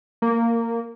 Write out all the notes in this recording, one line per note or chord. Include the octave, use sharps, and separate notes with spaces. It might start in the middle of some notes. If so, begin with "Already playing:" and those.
A#3